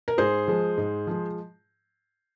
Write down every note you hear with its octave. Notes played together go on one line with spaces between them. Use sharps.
A#4
G#2 G#4 C5
F3 G#3
G#2
F3 G#3